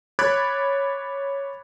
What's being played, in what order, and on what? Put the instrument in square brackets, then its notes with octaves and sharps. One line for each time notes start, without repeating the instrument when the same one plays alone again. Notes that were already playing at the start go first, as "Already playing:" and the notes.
[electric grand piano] C#5 B5 D6 F#6 G#6 A6